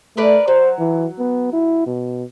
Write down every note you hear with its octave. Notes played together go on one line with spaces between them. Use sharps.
A3 A#4 B4 D5
F#3 C5
E3
B3
E4
B2